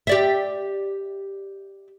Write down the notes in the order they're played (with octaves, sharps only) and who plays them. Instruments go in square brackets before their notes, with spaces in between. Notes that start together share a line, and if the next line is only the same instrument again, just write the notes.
[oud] G4 D5 E5